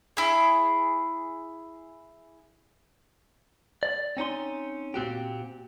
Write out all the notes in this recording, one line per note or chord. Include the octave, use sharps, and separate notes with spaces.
E4 G#4
D5
C4 C#4 D#4 C6
A#2 C4 F#4 G4